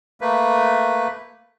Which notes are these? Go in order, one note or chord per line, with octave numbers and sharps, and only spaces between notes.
A3 A#3 B4